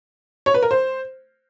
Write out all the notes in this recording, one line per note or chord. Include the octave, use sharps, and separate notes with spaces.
C#5
B4
A#4
C5